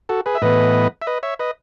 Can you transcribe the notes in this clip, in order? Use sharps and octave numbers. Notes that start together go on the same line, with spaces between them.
F#4 A4
G#4 B4
E5
A2 E3 B3 B4 D#5
E5
B4 D#5
C#5 E5
B4 D#5